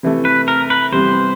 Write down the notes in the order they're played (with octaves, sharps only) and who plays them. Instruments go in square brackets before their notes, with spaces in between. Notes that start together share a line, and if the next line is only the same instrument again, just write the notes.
[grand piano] C3 E3 A3
[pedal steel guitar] B4
A#4
B4
[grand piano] C3 E3 G3 B3 [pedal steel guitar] C5